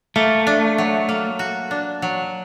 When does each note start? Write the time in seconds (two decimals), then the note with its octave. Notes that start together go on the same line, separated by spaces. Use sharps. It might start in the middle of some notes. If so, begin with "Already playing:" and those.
0.16 A3 A#3
0.47 D4
0.78 F#3
1.09 A#3
1.39 F#4
1.71 D4
2.02 F#3